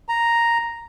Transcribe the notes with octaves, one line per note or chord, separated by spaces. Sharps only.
A#5